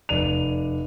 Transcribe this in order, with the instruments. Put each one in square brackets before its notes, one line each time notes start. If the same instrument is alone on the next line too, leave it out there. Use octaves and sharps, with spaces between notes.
[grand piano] F1 D5 D#7 F7